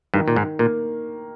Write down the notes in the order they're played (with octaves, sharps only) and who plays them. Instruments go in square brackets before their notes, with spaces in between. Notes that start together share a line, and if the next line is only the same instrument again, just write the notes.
[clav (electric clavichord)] G2 [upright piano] D#3
[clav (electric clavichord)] A#2
G#2
[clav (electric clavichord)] A#2 [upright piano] A#3